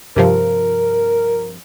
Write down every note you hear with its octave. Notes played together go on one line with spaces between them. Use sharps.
G2 C3 F3 A#4